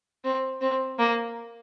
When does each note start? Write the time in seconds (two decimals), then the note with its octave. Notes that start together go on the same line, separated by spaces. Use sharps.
0.24 C4
0.61 C4
0.99 A#3